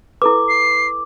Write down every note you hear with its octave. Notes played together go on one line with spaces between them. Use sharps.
E4 A4 B4 D6
C7